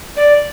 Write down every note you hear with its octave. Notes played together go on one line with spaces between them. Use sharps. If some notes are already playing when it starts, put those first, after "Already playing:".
D5